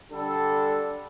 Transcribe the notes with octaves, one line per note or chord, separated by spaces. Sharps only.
D3 G3 D4 A4